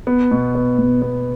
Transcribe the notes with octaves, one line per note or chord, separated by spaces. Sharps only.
B3
B2
B3
B2
B3